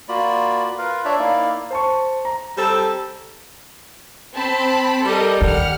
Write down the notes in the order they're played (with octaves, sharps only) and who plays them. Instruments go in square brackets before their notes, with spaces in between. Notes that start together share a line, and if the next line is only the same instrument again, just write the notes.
[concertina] A#3 F4 F#4 D5 B5
F4 A#4 B4 F5
D4 C#5 D5 E5
A#3 D#4 E4 D5 F5
[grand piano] C5 A5 C#6
A#5
[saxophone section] G3 C4 A4
[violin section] C4 A5 B5
[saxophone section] G3 [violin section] A4 A#4 D#5
[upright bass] D#2 [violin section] F#5 F6